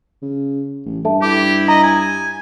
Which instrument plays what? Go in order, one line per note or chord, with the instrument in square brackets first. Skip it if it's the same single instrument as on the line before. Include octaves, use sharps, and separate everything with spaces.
[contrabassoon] C#3
A1
[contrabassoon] G2 [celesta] A4 E5 A5
[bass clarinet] E4 [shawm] G4 [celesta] D6
[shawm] D#5 [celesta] A#5
[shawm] G#5